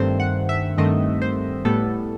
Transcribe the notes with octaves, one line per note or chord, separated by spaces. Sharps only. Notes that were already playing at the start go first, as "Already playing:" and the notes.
Already playing: G2 D#3 A3 C4 C5
F#5
E5
G2 D#3 A3 C4 D#5
C5
A2 G3 B3 A4